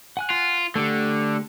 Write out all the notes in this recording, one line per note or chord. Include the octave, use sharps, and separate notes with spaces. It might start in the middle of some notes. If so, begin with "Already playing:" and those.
F#5 G#5 F#6
F4
D3 A3 G4